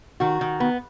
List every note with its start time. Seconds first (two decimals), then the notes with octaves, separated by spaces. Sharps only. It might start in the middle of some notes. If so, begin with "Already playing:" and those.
0.20 D#3 F#4
0.41 D#3
0.60 B3